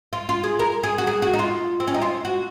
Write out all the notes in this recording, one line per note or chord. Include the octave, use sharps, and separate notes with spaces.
F4
F4
G#4
A#4
G#4
F#4
G#4
F#4
D#4
F4
C4
C#4
D#4
F4
F#4